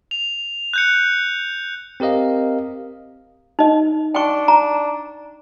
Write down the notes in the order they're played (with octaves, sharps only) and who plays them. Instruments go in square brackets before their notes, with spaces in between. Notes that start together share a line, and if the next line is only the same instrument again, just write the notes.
[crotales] F7
F#6 G6 C#7
[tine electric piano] C4 G4 A#4 D#5 F5
[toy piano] D#4 D#5
[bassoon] D4 [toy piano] G5 C#6
[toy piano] A#5